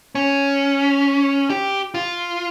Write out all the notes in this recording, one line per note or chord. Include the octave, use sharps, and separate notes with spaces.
C#4
G4
F4